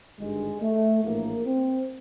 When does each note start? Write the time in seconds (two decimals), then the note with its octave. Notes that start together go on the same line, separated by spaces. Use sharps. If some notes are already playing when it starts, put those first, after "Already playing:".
0.19 G#1 G2 D3 G#3
0.61 A3
1.04 A#1 A2 E3 A#3
1.45 C4